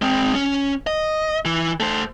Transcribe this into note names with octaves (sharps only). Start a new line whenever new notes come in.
G#3 C4
C#4
D#5
E3
A3 C5